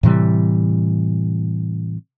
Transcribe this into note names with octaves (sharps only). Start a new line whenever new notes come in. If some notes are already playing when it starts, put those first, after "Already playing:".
A2 C3 E3 G3